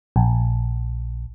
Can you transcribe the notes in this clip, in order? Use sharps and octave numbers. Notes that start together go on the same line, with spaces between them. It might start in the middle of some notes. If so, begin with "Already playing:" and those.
A#1